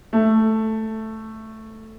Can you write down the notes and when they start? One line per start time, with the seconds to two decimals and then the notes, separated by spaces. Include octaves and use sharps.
0.13 A3